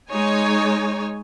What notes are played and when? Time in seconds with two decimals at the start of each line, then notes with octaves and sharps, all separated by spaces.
0.10 G#3 D#4 C#5 G#5